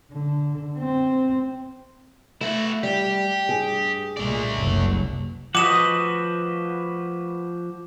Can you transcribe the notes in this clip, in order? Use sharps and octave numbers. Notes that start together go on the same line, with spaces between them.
D3
C4
A3 E4 F#4
G3 G4
G2 G#4
C2 A#2 G#3 A3 D5
F#1 C2 F#3
F3 F#4 B4 D#5 F#5 D6 E7